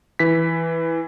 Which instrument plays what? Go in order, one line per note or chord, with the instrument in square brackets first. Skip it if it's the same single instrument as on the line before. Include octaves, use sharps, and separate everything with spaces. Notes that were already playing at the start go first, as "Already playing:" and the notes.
[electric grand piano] E3 B6